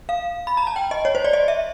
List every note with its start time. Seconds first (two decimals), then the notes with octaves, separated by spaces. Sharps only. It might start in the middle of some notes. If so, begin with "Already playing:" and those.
0.09 F5
0.47 B5
0.57 A#5
0.67 A5
0.76 G5
0.91 D#5
1.05 C#5
1.15 C5
1.24 D5
1.33 D#5
1.48 E5